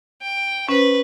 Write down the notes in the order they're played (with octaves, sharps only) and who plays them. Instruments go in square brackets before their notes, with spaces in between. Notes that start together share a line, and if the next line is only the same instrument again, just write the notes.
[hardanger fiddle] G5
[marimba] C#4 C5 [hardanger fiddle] B4